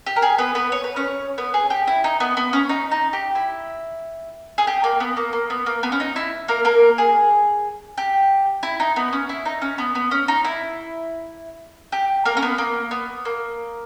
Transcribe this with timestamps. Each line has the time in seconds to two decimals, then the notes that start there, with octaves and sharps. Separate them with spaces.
0.06 G4
0.16 A#4
0.22 G#4
0.38 B3 B4
0.55 B3 B4
0.72 C#5
0.84 B4
0.96 C#4 C#5
1.38 B3 B4
1.54 G#4
1.70 G4
1.87 E4
2.04 D#4
2.20 B3
2.37 B3
2.53 C#4
2.69 D#4
2.91 D#4
3.13 G4
3.35 E4
4.58 G#4
4.67 G4
4.84 A#3
5.00 B3
5.17 A#3
5.33 A#3
5.50 B3
5.66 A#3
5.83 B3
5.92 C#4
6.00 D#4
6.16 E4
6.48 A#3 A#4
6.65 A#3 A#4
6.98 G#4
7.98 G4
8.63 E4
8.80 D#4
8.96 B3
9.13 C#4
9.29 E4
9.45 D#4
9.62 C#4
9.78 B3
9.95 B3
10.11 C#4
10.28 D#4
10.45 E4
11.92 G4
12.25 A#3 A#4
12.37 C#4
12.42 B3
12.58 A#3
12.91 B3
13.25 A#3